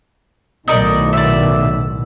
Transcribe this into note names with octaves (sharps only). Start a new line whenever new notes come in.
B1 A2 D#3 D#4 A#4 D5
D5 E5